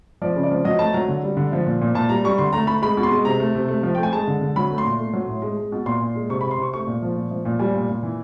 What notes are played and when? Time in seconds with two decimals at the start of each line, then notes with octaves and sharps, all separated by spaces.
0.22 F3 D5
0.36 C#3
0.43 D5
0.50 F3
0.64 F#3 D#5
0.79 A3 A5
0.93 F#3 A#5
1.08 D3
1.23 G3
1.37 D3
1.52 F3
1.66 A#2
1.81 A#2
1.95 A#2 A5
2.09 G3 A#5
2.24 G3 C#6
2.38 D3 C6
2.53 A3 A#5
2.67 A3 B5
2.82 G#3 B5
2.97 B2
3.03 C6
3.12 G#3
3.25 C3 A#5
3.40 A3
3.55 C3
3.68 A3
3.83 F3
3.95 A3 G5
4.03 G#5
4.13 G#3 A5
4.27 D3
4.41 D3
4.56 F#3 B5
4.71 A3
4.78 C6
4.85 A#2
4.99 A3
5.13 F#3
5.28 A2
5.42 G#3
5.57 G#3
5.72 B2
5.86 A#2 C6
6.01 A#2
6.15 G#3
6.29 C3 C#6
6.41 C3 B5
6.51 C6
6.58 C3 C#6
6.73 A3 C#6
6.87 A#2
7.02 F3
7.16 A#2
7.31 F3
7.45 A#2
7.59 G3 G#5
7.75 A#2
7.89 A#2
8.03 E3